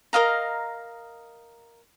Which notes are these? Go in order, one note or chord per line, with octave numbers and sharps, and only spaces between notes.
A#4 D#5 F5 A#5